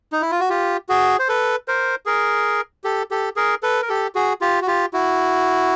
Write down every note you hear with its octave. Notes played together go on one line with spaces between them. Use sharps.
D#4
E4
F4
F#4
F4 G4
F#4 G#4
C5
A4 B4
A#4 C5
G#4 A#4
G4 A4
G4 A4
G#4 A#4
A4 B4
A#4
G4 A4
F#4 G#4
F4 G4
F#4
F4 G4
E4 F#4